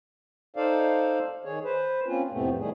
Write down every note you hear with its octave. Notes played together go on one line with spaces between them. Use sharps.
D#4 A4 C5 D5 F5
D#3 G#4 C#5
B4 C5
A#3 C4 C#4 F4
F2 A2 C3 A3 B3 C4
D#3 G3 A3 G#4